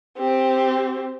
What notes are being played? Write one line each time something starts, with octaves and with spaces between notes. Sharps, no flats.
C4 G4